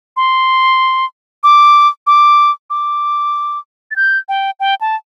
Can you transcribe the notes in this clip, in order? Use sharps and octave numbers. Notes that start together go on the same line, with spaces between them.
C6
D6
D6
D6
A6
G6
G5
G5
A5